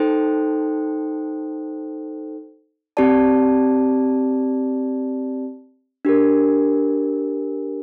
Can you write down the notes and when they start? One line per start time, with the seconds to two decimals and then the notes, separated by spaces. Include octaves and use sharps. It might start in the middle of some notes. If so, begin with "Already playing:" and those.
Already playing: D#4 A4 C5 G5
2.97 C4 G4 D5 A5
6.05 D4 G4 A#4